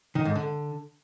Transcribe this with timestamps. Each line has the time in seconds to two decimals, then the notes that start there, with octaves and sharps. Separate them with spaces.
0.15 D#3
0.25 G#2
0.35 D3